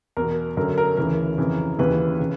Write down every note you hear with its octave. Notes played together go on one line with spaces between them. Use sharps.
E2 B2 A#4
F#2 D3 A#4
A#4
D2 C#3 E3 A#4
F2 C#3 E3
D#2 C#3 E3 B4
C#3